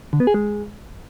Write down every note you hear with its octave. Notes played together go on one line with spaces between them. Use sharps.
D3
B3
G#4
G#3